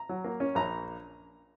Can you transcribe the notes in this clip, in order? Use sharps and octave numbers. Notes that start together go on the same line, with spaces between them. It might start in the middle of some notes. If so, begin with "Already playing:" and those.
Already playing: A#5
F#3
A#3
C#4
A#1 A#5